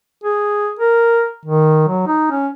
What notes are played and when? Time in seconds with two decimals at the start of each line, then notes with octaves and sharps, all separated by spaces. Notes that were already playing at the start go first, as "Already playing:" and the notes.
0.24 G#4
0.79 A#4
1.45 D#3
1.88 F#3
2.07 D#4
2.31 C#4